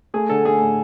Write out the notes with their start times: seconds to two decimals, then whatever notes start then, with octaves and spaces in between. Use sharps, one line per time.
0.14 A3 G#4
0.29 D3 A4
0.45 A3 G#4
0.61 A2